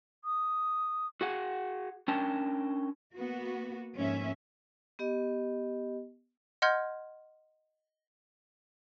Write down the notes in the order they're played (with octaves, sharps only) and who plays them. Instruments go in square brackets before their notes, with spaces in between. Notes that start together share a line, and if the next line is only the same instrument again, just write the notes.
[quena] D#6
[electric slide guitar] F#4 G#4 F#5
C#4 D4 A#4 G5 A5
[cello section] A#3 B3 F#4
F2 G#2 A#3 C#4 E5
[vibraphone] B3 G4 D#5
[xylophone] D#5 F#5 C6 F6 G6 G#6